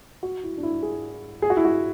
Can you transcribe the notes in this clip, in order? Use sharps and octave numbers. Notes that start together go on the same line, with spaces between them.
F#4
E4
D4
E4
G#4
G#4
F#4
E4
F#4